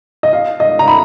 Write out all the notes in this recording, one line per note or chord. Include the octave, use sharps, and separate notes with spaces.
D#5
F5
D#5
A#5
B5